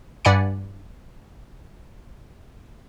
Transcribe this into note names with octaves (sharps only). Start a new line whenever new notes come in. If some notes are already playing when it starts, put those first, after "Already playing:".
G2 D5 F#5 G#5 B5 C#7